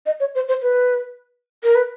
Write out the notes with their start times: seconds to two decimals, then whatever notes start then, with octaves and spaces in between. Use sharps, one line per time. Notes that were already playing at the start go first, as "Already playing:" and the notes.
0.06 D#5
0.20 C#5
0.35 C5
0.49 C5
0.62 B4
1.64 A#4
1.75 B4